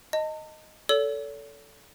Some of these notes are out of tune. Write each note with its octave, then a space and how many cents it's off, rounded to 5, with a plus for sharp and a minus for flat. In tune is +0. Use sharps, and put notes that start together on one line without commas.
D#5 +0 A5 +40
A4 +0 C#5 +45 E6 +0